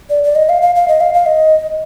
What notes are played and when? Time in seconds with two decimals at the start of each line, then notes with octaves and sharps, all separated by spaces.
0.10 D5
0.24 D5
0.36 D#5
0.49 F5
0.62 F5
0.75 F5
0.88 D#5
1.01 F5
1.14 F5
1.26 D#5